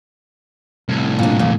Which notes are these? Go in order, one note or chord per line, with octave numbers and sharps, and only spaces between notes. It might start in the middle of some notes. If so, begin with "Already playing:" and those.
C2 A2
A#2 D4
E2 A#2